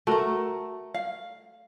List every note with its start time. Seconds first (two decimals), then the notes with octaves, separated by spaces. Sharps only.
0.07 A3 F#4 A#4 A#5
0.94 F5